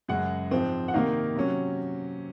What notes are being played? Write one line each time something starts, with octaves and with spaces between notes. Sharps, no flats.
F#2 C#3 G#3 F#5
G#2 F3 C4
F#5
C3 D#3 A#3 D#4 F5
C3 F#3 C#4